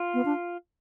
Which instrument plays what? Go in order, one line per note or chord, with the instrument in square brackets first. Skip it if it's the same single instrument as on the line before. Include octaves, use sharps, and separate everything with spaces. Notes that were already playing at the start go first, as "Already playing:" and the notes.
Already playing: [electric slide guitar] F4
[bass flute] B3
D4